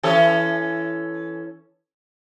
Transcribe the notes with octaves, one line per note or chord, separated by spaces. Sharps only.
E3 C#4 A4